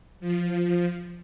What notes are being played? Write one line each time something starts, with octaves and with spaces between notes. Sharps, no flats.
F3